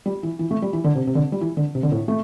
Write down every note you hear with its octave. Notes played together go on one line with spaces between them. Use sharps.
G3
E3
E3
A3
G3
E3
D3
C3
C3
D3
G3
E3
D3
C3
D3
A2
A3